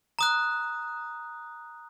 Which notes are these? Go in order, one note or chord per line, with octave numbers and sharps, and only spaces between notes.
A#5 D#6 F#6